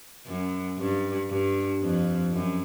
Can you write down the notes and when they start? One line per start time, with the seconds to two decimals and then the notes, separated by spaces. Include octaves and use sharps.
0.27 F#2
0.78 G2
1.30 G2
1.82 F2
2.33 F#2